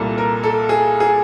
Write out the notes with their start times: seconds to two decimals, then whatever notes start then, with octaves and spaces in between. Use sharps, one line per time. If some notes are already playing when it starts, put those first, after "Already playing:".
Already playing: C2 A#2 G3 A4
0.18 A#4
0.43 A4
0.69 G#4
1.00 G#4